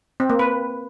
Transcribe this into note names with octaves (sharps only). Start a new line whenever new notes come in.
C4
A#3
B4